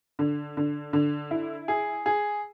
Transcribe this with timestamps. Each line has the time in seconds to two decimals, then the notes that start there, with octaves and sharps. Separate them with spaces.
0.19 D3
0.57 D3
0.93 D3
1.31 E4
1.68 G#4
2.06 G#4